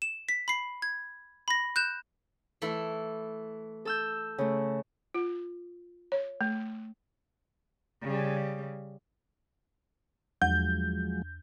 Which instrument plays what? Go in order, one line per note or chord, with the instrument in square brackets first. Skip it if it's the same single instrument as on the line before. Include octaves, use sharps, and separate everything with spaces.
[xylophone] E7
B6
B5 C7
G#6
B5 A#6
F#6 G6 E7
[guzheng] E3 A3 E4
[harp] A4 E6 G6
C#3 A3
[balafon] F4
C#5
A3
[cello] C#3 G3
[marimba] E2 [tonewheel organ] F3 F#3 G#3 [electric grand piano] G6